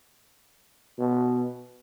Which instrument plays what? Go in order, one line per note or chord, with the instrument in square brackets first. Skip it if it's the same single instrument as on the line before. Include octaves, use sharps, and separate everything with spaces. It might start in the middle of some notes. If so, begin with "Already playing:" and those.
[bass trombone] B2